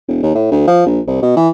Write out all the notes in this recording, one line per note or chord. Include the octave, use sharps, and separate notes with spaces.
E1
D#2
A2
D2
F3
A#1
C2
B2
E3